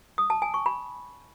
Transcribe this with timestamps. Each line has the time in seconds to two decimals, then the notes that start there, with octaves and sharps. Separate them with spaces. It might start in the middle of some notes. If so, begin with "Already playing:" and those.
0.18 D#6
0.30 A5
0.42 G#5
0.54 C#6
0.66 B5